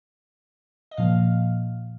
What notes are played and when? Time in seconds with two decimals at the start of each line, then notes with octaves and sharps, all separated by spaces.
0.91 D#5
0.97 A#2 F3 F5